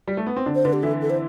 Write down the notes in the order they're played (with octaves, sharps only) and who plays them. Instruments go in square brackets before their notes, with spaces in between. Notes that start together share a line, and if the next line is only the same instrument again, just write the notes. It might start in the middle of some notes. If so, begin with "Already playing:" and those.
[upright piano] G3
A3
B3
C4
D3 D4
[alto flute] C5
[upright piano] D3 D4 [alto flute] B4
[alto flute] G4
[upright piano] E3 E4 [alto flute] A4
[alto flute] A4
C5